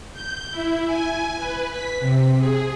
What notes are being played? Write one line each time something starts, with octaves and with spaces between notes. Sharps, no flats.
G6
E4
G#5
B4
B6
C3
G#4